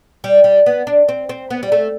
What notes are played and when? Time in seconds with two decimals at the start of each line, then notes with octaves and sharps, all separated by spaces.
0.24 G3
0.44 G3
0.66 B3
0.87 D4
1.08 C4
1.29 C4
1.50 B3
1.63 G3
1.72 A3